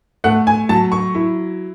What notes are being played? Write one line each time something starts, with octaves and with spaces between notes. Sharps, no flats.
A3 F#5
G#5
F#3 A5
C#6
E4